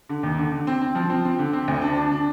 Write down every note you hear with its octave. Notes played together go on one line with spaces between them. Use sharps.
D3
D#2
D3
D3
C4
C4
F3
C4
C4
D3
C4
D2
D4
D4
D4